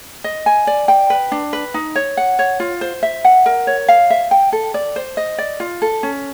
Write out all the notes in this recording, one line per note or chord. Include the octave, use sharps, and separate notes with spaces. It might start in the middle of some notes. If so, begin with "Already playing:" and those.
D#5
G#5
D5
G5
B4
D4
B4
D#4
C#5
F#5
C#5
F4
C5
E5
F#5
A#4
C#5
F5
E5
G5
A4
D5
C5
D#5
D5
F4
A4
C#4